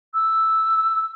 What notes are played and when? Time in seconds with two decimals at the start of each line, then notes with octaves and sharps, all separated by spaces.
0.14 E6